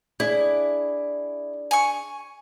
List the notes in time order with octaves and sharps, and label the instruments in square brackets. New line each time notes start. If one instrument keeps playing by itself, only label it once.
[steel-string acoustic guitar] D4 G#4 D5 [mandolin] E4
[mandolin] G#5 C#6